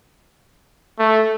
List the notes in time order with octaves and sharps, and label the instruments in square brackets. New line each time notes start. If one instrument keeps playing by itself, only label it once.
[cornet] A3